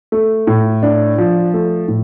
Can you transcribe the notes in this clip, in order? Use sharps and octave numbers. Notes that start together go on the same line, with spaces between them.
A3
A2
D4
F3
A3
A2